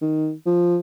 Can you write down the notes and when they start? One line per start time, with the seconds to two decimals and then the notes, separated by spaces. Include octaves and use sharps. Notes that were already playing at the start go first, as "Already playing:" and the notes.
0.01 D#3
0.46 F3